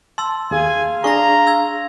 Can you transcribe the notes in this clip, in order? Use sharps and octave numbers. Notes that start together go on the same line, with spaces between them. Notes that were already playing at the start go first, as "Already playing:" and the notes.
A5 C6 E6
D#2 G#4 F5 G#5
D4 G#4 A#5 C#6 A#6
E6 G#6